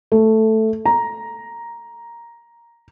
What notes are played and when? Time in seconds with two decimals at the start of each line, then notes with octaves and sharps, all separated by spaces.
0.12 A3
0.85 A#5